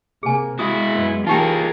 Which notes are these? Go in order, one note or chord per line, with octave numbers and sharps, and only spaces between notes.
C3 A#3 G#4 G#5
G#3 E4 F#4 D#6
F#2 B3
E3 A#3 D#4 F4 G4 G#4 A#4 G5